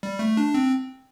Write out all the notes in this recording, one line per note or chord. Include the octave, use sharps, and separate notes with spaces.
G3
A3
D4
C4